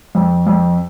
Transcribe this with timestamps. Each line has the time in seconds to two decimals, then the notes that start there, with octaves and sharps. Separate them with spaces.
0.15 F2
0.47 F2